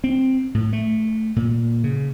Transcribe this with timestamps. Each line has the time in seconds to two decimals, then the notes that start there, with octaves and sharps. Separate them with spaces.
0.04 C4
0.55 A2
0.73 A3
1.36 A#2
1.84 C#3